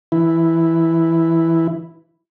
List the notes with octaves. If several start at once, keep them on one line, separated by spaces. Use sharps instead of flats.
E3 E4